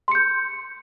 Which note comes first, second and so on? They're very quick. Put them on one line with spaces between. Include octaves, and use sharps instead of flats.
C6 C#7 G6